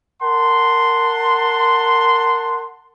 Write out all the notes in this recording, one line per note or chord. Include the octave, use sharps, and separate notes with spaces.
A#4 F#5 A5 C6